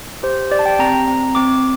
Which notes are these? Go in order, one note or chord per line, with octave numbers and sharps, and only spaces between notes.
G4 C5
G4 D5
A5
G5
C4 A#5
C4
C4 D6